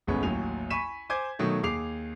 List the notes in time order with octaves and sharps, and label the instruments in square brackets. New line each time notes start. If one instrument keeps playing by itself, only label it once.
[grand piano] D1 G1 G#3 B3 C#4
A1 D#2 F#3 G#5 F7
G#5 B5 C#6 B6 D#7 E7
C5 G#5 D6 G6 G#6
B2 D#3 F#3 A3
D#2 G#4 D6 C7 F7